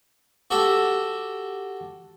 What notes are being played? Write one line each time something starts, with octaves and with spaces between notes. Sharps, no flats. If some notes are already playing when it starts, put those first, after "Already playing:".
F#4 G4 A4